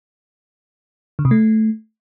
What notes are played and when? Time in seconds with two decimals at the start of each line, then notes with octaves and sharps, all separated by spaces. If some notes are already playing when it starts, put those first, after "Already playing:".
1.19 D3
1.25 C3
1.31 A3